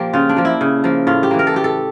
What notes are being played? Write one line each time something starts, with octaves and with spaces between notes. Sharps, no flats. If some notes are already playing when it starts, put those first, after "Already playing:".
Already playing: A#2 F3 A#3 G4
C#3 F4
D4
F3 A#3
E4
C#3
F3 A#3
A2 F4
G4
E3 A#3
A#4
A4
A2 G4
A4